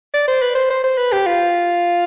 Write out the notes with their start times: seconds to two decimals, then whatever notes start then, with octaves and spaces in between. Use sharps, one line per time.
0.14 D5
0.28 C5
0.42 B4
0.55 C5
0.70 C5
0.84 C5
0.98 B4
1.12 G4
1.26 F4